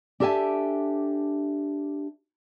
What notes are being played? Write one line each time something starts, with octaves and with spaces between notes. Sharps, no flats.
D4 G4 A4 E5 G#5 A5